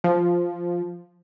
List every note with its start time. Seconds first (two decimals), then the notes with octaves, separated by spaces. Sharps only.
0.04 F3